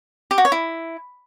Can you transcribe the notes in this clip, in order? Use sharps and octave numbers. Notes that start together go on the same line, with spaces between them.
G4
F#4
C#5
E4